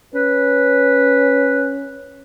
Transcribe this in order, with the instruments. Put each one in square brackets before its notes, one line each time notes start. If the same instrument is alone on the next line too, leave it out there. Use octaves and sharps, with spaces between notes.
[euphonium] C#4 [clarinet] B4